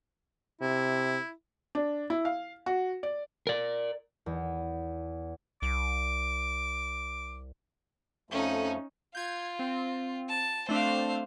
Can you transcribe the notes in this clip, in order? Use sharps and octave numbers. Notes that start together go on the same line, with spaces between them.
C3 E4
D4
E4
F5
F#4
D5
A#4 D5
E2
C2 D6
F2 F3 A3 C#4 D#4
F4 G6 G#6
C4
A5
A3 C4 D4 C5 F5